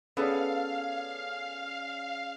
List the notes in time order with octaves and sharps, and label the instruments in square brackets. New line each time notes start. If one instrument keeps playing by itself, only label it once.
[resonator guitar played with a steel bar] B3 A4 B4 [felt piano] C#4 G#4 D5 [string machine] F5